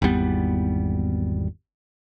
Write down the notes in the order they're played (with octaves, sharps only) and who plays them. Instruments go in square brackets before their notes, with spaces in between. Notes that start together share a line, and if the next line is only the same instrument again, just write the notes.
[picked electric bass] G#1 E2 G3 B3